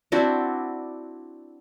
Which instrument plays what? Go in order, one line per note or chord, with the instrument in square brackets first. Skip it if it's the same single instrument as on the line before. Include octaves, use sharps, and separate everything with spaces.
[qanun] C4 D4 E4 F#4